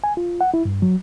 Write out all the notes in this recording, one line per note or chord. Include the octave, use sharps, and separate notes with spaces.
G#5
F4
F#5
E4
G2
F#3